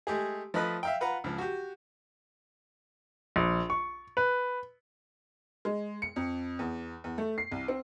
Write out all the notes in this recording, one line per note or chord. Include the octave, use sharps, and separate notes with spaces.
G#3 A3 G4 G#4
F3 A3 B4 D#5 B5 F#6
E5 F5 G5
F4 B4 F#5 A#5
C#2 F3
F#4 G4
A#1
C#6
B4
G#3
C#7
F2
E2
E2
A3
C7
C2
C4